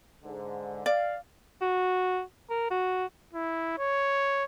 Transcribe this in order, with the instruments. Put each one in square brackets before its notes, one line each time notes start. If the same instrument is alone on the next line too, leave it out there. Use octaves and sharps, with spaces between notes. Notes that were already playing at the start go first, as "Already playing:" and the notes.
[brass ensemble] G#2 D3
[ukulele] D5 [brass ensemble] F5
[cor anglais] F#4
A#4
F#4
[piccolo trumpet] E4
C#5